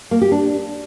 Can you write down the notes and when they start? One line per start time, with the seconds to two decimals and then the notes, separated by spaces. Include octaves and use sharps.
0.11 A#3
0.21 G4
0.32 D4